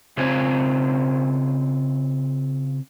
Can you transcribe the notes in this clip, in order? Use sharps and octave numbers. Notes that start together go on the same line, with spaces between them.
C#3 C4 F4 C5 F5 G#5